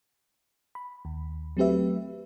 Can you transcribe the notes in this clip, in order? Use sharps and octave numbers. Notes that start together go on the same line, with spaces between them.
B5
D#2
F#3 A3 C4 G4 B4 E5